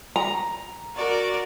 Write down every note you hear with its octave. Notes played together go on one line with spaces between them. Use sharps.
A#5
F#4 A#4 D5